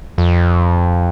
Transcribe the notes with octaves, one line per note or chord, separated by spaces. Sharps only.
F2